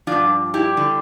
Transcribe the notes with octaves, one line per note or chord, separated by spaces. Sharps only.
G2 F3 D4 F4
E4 G4
D3 G3